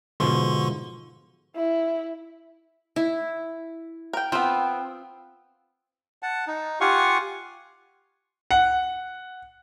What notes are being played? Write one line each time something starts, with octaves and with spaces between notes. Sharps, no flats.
G#2 B2 D3 F3 C6 C#6
E4
E4
A#4 G5
B3 C4 F4 C5
F#5 A5
D#4
F4 G4 F5 F#5 G#5 C#6
F#5